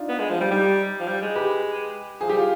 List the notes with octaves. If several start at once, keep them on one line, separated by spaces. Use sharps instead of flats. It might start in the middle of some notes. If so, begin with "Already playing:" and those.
Already playing: D4 D#4 F4
B3
G#3
F3
G3
G3 D#4 G4
F3
G3
G#3
G4 B4
F3 G#4
G3 G4
F4